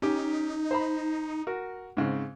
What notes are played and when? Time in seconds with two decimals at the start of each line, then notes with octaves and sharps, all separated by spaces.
0.02 C#4 D#4 G4
0.71 C5 A#5 B5
1.47 F#4 A#4
1.97 G#2 C#3 C4